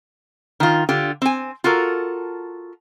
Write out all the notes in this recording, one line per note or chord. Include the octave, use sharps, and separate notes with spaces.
D#3 F4
D3 F4 G4
C4 G#5
F4 F#4 A4 A#4